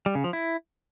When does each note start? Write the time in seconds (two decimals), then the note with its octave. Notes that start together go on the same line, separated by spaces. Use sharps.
0.06 G3
0.15 C#3
0.24 F3
0.33 E4